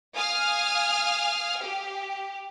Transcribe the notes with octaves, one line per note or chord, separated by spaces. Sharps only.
F5 G#5 D#6 F6
G4